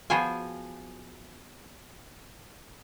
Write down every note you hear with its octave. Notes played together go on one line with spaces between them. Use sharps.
F3 B3 F#4 G#4 G5 G#5